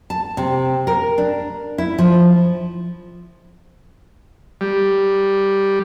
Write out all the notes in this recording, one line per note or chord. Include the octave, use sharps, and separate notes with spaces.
A5
C3
A#4
D4
E4
F3
G3